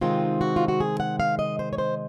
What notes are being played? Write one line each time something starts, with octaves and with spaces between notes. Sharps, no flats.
C3 D#3 G#3 C4 D#4 F4
F#4
F4
F#4
G#4
F#5
F5
D#5
C5
C#5
C5